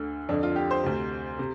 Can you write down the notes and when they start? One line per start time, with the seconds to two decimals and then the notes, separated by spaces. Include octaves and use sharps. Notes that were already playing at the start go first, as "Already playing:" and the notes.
Already playing: D2 D3
0.29 F2 D3 D4
0.43 F4
0.56 G4
0.71 C5
0.84 D2 C3
1.39 C3